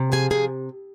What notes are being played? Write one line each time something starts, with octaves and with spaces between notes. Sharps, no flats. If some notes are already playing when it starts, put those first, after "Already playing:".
Already playing: C3
F3 G#4 G#5
C3 G#4 G#5